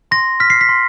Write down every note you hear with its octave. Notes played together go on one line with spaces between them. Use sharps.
C6 A#6
F6 B6
C7
B6
C6